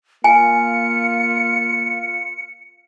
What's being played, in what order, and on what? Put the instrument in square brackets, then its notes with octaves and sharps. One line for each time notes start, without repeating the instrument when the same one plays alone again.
[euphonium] A#3 [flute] F4 [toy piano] G#5 [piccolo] C#7